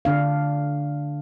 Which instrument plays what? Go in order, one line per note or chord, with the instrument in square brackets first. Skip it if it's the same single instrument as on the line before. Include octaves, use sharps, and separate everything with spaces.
[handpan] D3 D4 F5